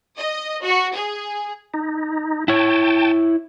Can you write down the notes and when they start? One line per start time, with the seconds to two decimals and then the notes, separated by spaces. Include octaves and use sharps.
0.16 D#5
0.63 F#4
0.94 G#4
1.74 D#4
2.48 E4 C#5 G5 A5